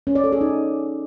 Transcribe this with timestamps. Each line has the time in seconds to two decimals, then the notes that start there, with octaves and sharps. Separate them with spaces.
0.07 C#4
0.15 D5
0.24 A4
0.32 G#4
0.41 D#4